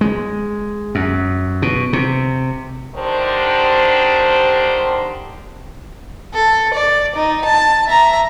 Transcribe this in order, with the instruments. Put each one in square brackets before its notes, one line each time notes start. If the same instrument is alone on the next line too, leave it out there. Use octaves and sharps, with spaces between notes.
[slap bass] G#3
F#2
B2
C3
[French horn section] D3 D#3 D4 G4 C5
[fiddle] A4
D5
D#4
A5
E5 A#5